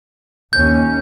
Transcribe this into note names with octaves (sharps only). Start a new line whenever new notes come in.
D#2 C#4 G6